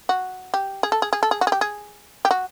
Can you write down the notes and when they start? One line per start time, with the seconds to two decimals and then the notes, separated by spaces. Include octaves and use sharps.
0.09 F#4
0.54 G4
0.83 G#4
0.92 A4
1.02 G#4
1.13 G#4
1.23 A4
1.31 G#4
1.41 F#4
1.47 G#4
1.52 G4
1.61 G#4
2.25 G4
2.31 F#4